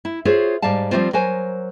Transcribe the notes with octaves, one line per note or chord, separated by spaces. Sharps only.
E4
F4 F#4 G#4 C5 C#5 E5
G#2 G3 D5 F5 A5
F3 G3 A3 C4 F4 C5
F#3 A#4 C5 G#5